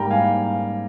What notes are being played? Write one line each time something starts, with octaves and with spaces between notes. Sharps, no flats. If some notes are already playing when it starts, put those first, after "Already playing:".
Already playing: G#2 G3 A#3 G5 A#5
F5 G#5